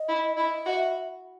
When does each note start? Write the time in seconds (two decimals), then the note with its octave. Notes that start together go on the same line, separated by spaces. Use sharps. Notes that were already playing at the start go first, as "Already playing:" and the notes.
Already playing: D#5
0.09 E4
0.37 E4 D#5
0.65 F#4 E5